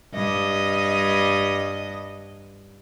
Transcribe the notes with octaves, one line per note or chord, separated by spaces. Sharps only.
G2 D#5